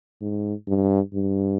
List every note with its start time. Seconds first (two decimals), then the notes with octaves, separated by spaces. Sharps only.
0.21 G#2
0.68 G2
1.14 G2